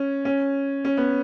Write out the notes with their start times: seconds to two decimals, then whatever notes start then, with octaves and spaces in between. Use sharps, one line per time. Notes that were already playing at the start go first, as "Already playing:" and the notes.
Already playing: C#4
0.25 C#4
0.85 C#4
0.97 B3